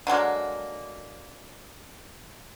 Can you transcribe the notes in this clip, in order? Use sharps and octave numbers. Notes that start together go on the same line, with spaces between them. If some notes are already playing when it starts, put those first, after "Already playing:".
D3 F#3 G#3 A#3